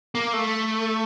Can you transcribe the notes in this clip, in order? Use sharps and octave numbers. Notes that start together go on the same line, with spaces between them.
A#3
A3